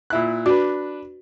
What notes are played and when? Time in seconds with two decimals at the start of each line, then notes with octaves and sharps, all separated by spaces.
0.10 A#2 E4 F#6
0.46 D4 F#4 B4